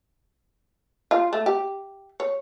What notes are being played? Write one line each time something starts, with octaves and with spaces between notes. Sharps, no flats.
F4
A3
G4
C#5